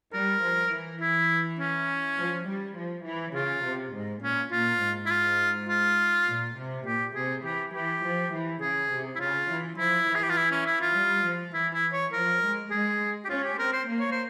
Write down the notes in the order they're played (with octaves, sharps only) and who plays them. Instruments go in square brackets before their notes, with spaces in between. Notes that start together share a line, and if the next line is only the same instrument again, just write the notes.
[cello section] G3 [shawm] A#4
[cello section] F3
E3
[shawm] E4
C#4
[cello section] F3
G3
F3
E3
[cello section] C#3 [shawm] F4
[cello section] C3
G#2
[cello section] A#2 [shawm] C#4
[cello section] A#2 [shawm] F4
[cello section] G#2
[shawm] E4
F4
F4
[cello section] A#2
C3
[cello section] A#2 [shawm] G4
[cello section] C3 [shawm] G#4
[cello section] E3 [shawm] G4
[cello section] E3 [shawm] G4
[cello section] F3
E3
[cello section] C#3 [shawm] G#4
[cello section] C3
[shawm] E4
[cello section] C#3 [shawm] F4
[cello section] E3
[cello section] F3 [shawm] E4
[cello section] E3
[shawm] G#4
G4
F4
E4
C#4
E4
F4
[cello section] G3
F3
[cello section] E3 [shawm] E4
[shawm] E4
C#5
[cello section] F3 [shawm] A#4
[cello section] G#3
[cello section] G#3 [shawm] G#4
[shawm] G4
[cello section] C#4 [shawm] F4
[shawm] G4
[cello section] C4 [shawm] A#4
[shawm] C5
[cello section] A#3
[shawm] C#5
C5